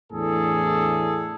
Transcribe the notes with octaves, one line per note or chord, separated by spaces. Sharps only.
E2 A2 D4 G#4 A4